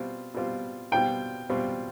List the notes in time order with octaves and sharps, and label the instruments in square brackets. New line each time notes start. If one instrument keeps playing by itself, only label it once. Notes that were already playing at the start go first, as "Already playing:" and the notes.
Already playing: [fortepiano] B2 G3 C4 F4
B2 G3 C4 F4
[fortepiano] B2 G3 C4 F4 [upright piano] G5
[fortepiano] B2 G3 C4 F4